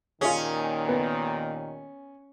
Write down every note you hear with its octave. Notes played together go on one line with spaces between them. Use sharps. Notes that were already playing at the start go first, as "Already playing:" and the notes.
D#2 A#2 D#3 C#4 F4 G#4
B3